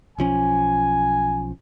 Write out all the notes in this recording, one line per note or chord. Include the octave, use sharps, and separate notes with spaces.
B1 F3 C#4 G#5